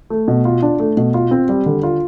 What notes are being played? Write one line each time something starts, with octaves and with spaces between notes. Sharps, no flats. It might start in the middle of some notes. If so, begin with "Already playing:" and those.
A3
B2
F4
D4
A3
B2
F4
C4
G3
D3
F4